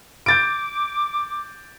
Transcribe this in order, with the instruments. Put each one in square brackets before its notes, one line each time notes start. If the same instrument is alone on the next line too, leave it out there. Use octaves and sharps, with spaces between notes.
[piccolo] D6 [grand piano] G6 A6 D7